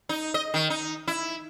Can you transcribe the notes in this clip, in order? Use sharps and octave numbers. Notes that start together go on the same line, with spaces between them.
D#4
D#5
D#3
D#4
E4